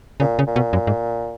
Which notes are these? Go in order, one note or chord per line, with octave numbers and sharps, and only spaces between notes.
A#2 C#3
C#3
A#2
B2
F#2
G#2